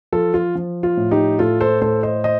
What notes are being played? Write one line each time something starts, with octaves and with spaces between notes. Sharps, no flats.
F3 F4 A4
F4
F3
F4
A2
D#4 G4
A2 F4 A4
A4 C5
A2 A4 C5
C5 D#5
C5 D#5